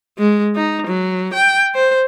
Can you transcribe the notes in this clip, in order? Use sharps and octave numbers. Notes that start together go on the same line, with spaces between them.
G#3
D#4
F#3
G5
C5